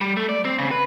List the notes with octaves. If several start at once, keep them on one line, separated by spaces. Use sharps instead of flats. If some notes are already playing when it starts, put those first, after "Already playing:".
G3
A3
D5
C4
C#3
B4